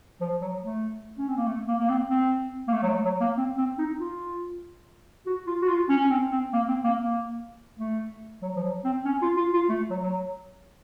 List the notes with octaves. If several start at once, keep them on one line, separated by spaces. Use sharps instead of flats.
F3
F#3
A3
C#4
C4
A#3
A3
A#3
A#3
C4
C4
A#3
A3
F#3
A3
F#3
A#3
C4
C4
D#4
F4
F#4
F4
F#4
F4
C#4
C#4
C4
C4
A#3
C4
A#3
A#3
A3
F#3
F3
F#3
C4
C#4
F4
F4
F4
A3
F#3
F#3